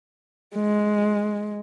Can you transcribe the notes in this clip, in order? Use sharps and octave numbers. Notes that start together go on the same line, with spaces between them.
G#3